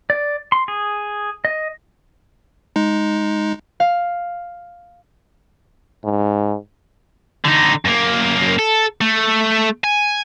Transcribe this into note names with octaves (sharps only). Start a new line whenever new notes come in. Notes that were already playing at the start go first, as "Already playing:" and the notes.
D5
C6
G#4
D#5
G#3 D#4
F5
G#2
D3 D#4
F#2 A#3
A4
A3
G#5